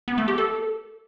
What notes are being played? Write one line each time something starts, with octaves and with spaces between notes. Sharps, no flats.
B3
A3
G4
A4